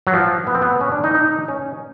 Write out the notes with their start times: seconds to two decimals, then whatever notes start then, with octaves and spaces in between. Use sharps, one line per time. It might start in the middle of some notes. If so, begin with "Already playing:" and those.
0.07 F#3
0.14 F3
0.47 B3
0.55 C4
0.62 B3
0.81 C#4
0.92 D4
1.04 D#4
1.15 D#4
1.48 C#4